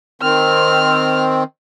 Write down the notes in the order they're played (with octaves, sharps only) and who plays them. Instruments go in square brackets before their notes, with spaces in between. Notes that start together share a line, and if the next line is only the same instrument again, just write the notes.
[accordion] D#3 C4 [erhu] F6